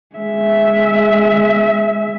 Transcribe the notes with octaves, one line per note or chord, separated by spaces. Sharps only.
G#3 E5